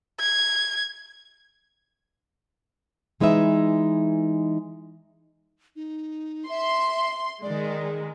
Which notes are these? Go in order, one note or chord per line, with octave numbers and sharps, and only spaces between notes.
G#6
E3 G#3 D#4 B4 E5
D#4
E5 C6
D#3 G#3 D5